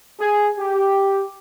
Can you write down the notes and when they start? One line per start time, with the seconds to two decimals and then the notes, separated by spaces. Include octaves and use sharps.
0.20 G#4
0.59 G4